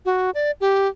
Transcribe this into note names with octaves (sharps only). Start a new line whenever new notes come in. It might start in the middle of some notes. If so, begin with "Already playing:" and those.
F#4
D5
G4